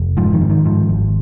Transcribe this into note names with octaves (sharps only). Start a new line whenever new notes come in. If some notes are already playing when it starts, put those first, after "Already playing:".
Already playing: F1
G#2 F3
D#3
G#2
D#3
G#2 F3
G#1